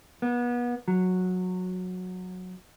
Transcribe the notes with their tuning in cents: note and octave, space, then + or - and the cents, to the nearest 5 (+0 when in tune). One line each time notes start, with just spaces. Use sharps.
B3 -30
F#3 -15